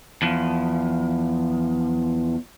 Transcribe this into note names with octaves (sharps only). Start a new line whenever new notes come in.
E2 F3